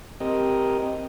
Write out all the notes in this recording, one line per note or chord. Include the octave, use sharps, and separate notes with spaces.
C4 G4 A#4 D#5